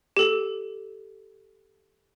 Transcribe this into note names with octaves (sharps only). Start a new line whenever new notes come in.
G4 A4